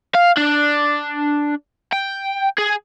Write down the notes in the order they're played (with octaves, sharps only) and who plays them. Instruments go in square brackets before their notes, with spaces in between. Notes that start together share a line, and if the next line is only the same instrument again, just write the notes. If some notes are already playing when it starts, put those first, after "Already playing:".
[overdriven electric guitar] F5
D4
G5
G#4